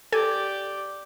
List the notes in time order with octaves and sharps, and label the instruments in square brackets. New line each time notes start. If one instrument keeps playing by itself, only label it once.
[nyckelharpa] G4 D5 [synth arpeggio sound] A4 G#5